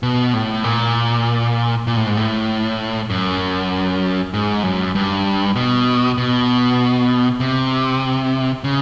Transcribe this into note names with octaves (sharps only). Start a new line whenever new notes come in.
B2
A2
A#2
A#2
A2
G#2
A2
F#2
G#2
F#2
G2
B2
B2
C3
C#3